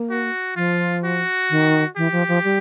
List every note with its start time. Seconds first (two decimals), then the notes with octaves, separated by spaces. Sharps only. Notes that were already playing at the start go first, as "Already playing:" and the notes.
Already playing: A#3
0.10 F#4
0.56 F3 F4
1.04 F#4
1.50 D#3
1.96 E3 G4
2.12 F3
2.28 F3
2.44 G3